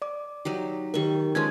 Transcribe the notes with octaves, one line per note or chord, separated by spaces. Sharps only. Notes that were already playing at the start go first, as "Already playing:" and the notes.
D5 D6
F#3 D#4 G4
D#3 G4 A#4 C#6
F3 G#3 C#4 C6 G#6